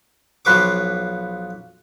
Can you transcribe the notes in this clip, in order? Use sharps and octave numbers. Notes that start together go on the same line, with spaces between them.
B1 F3 F4 B4 C#6 D6